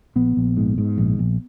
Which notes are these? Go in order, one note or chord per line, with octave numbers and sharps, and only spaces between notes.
A#1 B3
A#1
G#2
G#2
A#1
A#1